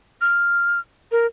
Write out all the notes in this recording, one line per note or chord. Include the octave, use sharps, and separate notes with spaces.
F6
A#4